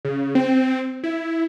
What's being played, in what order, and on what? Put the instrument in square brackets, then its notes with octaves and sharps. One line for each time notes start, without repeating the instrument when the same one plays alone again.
[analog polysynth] C#3
C4
E4